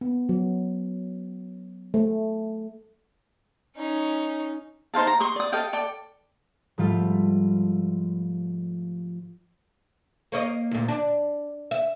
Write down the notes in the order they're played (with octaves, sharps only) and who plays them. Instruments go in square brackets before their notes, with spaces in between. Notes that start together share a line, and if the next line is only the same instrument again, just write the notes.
[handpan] B3
F#3
A3
[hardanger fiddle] C#4 D#4
[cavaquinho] D#4 C5 F5 A5
A#5
C6 C#6 D#6
D5 D#6
A4 D#5 F5 G5
A4 D5 G5
[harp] G#2 F3 G3 A3 F4
[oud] A#3 C#5 D#5
D2 A#2
D4
E5